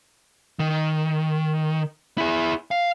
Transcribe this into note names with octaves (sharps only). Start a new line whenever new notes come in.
D#3
E4 G#4
F5